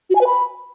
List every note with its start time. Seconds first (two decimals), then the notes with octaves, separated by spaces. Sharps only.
0.10 F#4
0.15 G#5
0.21 B4
0.27 B5